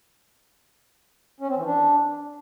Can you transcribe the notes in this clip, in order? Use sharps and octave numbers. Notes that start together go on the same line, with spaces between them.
C#4
C4
E3
D4